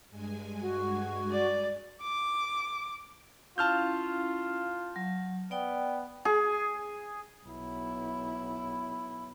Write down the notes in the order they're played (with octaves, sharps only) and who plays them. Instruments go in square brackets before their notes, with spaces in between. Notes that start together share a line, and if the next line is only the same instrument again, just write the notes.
[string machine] G2 G#3 G#5
[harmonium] F#4
[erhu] D5
[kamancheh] D6
[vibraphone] C#4 E4 F5 [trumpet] F4 [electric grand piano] A5 F6 G6
[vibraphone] F#3
[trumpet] B3 [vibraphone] D5 G5
[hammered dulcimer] G#4
[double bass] B1 E4